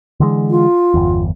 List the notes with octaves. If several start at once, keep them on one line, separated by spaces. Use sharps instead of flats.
D3 E3 G#3
F4
G1 E2